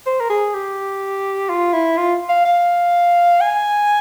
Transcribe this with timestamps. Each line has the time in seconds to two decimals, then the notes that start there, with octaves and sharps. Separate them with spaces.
0.06 C5
0.20 A#4
0.29 G#4
0.54 G4
1.49 F4
1.73 E4
1.97 F4
2.29 F5
2.45 F5
3.41 G#5